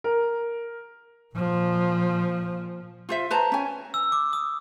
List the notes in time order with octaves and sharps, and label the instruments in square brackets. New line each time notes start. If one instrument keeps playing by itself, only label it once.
[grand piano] A#4
[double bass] A#2 F3
[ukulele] F4 C5 E5
B4 C5 A5 A#5
C#4 G#5
[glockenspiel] E6
D6
D#6